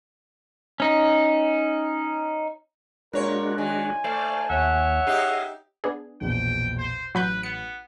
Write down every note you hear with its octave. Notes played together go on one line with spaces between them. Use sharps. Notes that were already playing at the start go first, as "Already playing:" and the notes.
C#4 D#4
A#2 G#3 D4 F#4 A#4 C#5
D#3 G#5
A3 C5 D5 F5
D#2 C#5 E5 F#5
D#4 G4 G#4 D#5 F5
B3 D4 G#4
A#1 E2 B2 G5
C5
A1 F#3 B4 B5 G6
B3 C#7